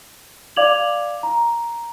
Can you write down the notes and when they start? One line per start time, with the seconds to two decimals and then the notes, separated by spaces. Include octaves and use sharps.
0.56 D5 F5 D6 G#6 F7 F#7
1.23 A#5